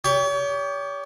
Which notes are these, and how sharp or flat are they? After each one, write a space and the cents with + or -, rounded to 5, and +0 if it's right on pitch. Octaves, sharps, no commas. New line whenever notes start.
G4 +20 C#5 +40